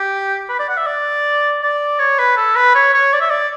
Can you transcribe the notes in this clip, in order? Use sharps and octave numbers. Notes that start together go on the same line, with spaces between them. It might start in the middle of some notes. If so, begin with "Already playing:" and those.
Already playing: G4
B4
D5
F#5
E5
D5
D5
C#5
B4
A4
B4
C#5
C#5
D5
E5
D5